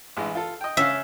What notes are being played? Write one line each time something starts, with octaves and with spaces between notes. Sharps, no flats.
A1 E3 G#3
F4 A4
D#5 G5
C#3 C#4 E5 F5